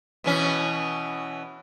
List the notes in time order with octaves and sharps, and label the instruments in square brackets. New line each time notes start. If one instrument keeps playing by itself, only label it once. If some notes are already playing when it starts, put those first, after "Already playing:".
[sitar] B2 E3 C#4